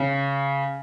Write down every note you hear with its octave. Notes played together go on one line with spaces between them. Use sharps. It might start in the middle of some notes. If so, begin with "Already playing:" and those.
Already playing: C#3